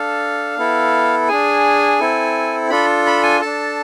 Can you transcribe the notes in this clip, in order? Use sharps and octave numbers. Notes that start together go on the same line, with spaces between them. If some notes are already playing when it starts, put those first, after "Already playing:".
Already playing: D4 A4 F5
B3 E4 A4
D4 G#4 G#5
C4 E4 A4
D4 F4 A4 B5
B5
G#5
D4 A4 A5